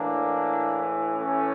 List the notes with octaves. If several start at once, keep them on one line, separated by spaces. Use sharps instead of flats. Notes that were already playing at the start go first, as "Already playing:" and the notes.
Already playing: A2 E3 A#3 D4
A3 C#4